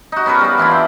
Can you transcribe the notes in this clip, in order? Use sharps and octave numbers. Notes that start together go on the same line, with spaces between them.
D#4 F#4
B3 C#4 A#4 B4
G3 F5
E3 D4 E4 F4
G5